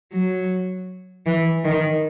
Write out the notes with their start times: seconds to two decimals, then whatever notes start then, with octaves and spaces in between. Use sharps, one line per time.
0.13 F#3
1.26 E3
1.64 D#3